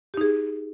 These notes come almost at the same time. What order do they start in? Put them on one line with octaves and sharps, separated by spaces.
G4 D#4 G#4